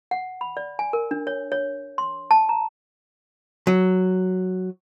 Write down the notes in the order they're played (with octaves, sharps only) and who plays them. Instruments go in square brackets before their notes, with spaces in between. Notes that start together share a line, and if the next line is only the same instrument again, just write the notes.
[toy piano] F#5
B5
D5
G#5
A#4
D4
C#5
C#5
C6
A5
A#5
[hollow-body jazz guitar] F#3